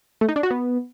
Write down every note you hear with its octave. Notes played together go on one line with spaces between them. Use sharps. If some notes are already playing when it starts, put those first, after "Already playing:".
A3
D#4
D4
F#4
B3